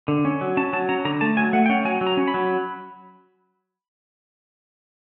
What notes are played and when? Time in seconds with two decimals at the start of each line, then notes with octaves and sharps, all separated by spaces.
0.08 D3
0.25 C#4
0.41 F#3
0.57 C#4 A5
0.73 F#3 A5
0.89 C#4 A#5
1.05 D3 A#5
1.21 A3 A5
1.37 F#3 G#5
1.53 A3 F#5
1.66 G5
1.69 C#4 F#5
1.85 F#3 G#5
2.01 F#3
2.07 A#5
2.17 C#4
2.28 B5
2.34 F#3